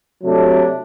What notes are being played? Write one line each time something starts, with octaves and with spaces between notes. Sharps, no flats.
C3 F#3 A3 D4 A4